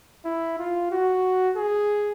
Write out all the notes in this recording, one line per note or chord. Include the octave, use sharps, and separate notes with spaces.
E4
F4
F#4
G#4